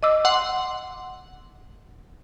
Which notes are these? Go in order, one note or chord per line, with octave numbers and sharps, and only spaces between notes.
D#5 D6 E6
F#5 C6